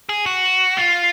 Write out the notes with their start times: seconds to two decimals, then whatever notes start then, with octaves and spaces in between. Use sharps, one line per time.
0.09 G#4
0.26 F#4
0.78 F4